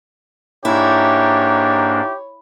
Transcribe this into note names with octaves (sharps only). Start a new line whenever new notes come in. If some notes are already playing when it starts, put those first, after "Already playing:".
G#2 A#3 D4 E4 G4 C#5